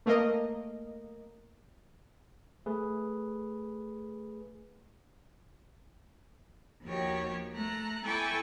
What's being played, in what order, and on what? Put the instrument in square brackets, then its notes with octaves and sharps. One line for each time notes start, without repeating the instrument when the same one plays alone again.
[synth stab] A3 A#3 A#4 D#5
[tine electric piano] A3 G#4 B4
[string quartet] D#2 F3 F#4 G4 C#5
A3 A#5 F#6
E4 A4 G5 G#5 C#6 D6